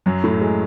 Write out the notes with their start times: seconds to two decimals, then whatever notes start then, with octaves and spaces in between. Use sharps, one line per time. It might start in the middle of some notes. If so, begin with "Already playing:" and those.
0.06 F#2 F#3
0.23 A2 A3
0.41 G#3